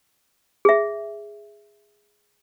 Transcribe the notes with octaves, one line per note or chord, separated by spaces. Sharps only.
G#4 E5